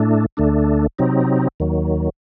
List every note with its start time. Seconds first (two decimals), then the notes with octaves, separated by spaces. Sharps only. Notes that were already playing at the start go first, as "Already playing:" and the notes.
Already playing: A2 A3 D4
0.37 D2 D3 A3 D4
0.99 C3 F#3 C4 D#4
1.60 D#2 D#3 F#3